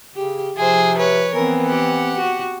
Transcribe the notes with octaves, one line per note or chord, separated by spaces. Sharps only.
C#3 G4
C3 F3 G#4 C5
B4 C#5
E3 B3 C4 A#4
G4 F#5
F#4